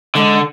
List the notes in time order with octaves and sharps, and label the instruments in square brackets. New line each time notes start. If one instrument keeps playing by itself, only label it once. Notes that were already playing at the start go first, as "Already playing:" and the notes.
[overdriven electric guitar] D3 [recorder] G#3